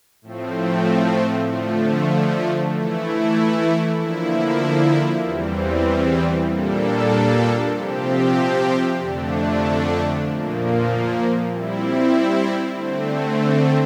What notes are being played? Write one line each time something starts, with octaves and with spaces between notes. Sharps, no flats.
A2 F3 A3 C4
D3 F3 A3
E3 A3 E4
D3 F3 A#3 E4
E2 E3 G3 C4
A#2 G3 A#3 D4 A4
C3 F3 C4 G4
F2 D3 A3 D4
A#2 F3 A#3
G3 C4 E4
D3 A3 C4